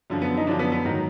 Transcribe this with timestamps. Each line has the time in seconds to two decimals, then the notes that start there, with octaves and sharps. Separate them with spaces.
0.10 F#2 D3 F3
0.22 B3
0.37 D#4
0.47 F#2 D3 F3 D4
0.59 B3
0.72 B3
0.84 G#2 D#3 F#3